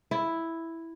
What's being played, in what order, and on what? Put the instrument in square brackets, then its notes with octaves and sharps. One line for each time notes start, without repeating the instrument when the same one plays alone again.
[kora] E4